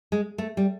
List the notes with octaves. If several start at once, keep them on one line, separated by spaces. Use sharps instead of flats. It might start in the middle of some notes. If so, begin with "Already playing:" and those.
G#3
A3
G3